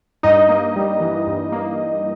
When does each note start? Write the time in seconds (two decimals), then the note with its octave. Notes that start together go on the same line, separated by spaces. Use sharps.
0.23 G2 D#4 D#5
0.49 A#3
0.76 G3
1.01 E3
1.27 G2
1.52 A#3